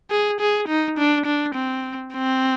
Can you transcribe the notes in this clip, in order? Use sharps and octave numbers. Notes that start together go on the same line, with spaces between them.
G#4
G#4
D#4
D4
D4
C4
C4